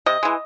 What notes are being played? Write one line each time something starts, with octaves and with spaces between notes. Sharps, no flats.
C3 D#5
E3 G#3